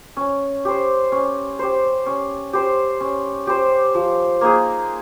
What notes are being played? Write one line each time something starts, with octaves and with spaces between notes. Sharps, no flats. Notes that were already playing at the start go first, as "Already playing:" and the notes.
C#4
G4 C5
C#4
G4 C5
C#4
G4 C5
C#4
G4 C5
F3
A#3 D#4 G#4